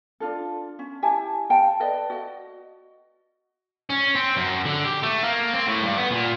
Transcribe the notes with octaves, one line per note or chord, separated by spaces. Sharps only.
D4 F4 A4
C#4
E4 G4 G#5 A5
F5 G5 A5
A4 B4 D5 D#5
F#4 D#5
C#4
C4
F#2
D3
G4
A3
A#3
C4
A2
G2
B3
A#2